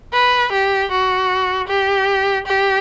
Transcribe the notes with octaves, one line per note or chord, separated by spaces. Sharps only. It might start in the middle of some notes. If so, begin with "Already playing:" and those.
B4
G4
F#4
G4
G4